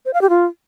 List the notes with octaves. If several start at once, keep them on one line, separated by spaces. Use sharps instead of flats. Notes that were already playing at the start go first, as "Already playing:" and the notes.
C5
F5
G4
F4